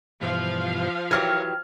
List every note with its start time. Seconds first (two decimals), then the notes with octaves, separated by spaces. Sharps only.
0.21 G2 B2 E3 F3 F5
1.11 E3 F#3 G4 A#4 C#5 F6 G#6